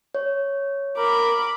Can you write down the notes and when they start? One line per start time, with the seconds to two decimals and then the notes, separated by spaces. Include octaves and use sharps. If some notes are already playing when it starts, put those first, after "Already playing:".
0.15 C#5
0.97 A#4 B5 D6